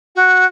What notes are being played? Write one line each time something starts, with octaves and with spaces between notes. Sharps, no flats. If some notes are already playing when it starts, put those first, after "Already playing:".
F#4